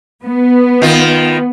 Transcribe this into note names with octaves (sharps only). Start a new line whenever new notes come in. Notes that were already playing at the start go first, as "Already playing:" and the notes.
B3
D#3 F4